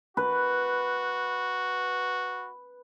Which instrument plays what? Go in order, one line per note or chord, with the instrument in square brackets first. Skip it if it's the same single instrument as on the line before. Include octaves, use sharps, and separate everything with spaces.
[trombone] F#4 [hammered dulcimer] B4